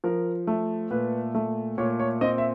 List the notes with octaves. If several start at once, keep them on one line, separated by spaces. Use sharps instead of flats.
F3 A#4
A3
A#2 B4
A3
A#2 C#5
C#5
C4 D#5
E5